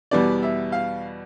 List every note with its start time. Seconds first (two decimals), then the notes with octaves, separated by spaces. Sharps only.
0.11 E2 B2 G3 B3 D5
0.43 E5
0.72 F5